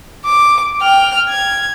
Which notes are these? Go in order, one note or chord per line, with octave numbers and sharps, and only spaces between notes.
D6
G5 F6
G#6